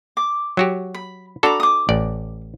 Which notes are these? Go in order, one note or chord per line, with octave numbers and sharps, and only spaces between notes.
D6
F#3 F#4 G4
B5
D4 F#4 A4 A#5 B5 D6
D6 D#6
A1 D5